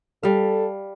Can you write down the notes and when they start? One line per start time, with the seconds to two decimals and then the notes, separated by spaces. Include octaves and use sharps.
0.23 G3 A4 F5